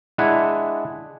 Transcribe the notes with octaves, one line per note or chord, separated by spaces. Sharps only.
G#3 D4 E4 F#5 G#5